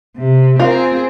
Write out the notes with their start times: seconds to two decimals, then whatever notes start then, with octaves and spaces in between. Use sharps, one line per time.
0.17 C3
0.60 C4 F4 G#4 A#4